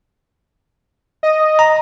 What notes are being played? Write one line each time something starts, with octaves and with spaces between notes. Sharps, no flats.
D#5
A#5